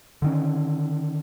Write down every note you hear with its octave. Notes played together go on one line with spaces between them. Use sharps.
D3 D#3 C#4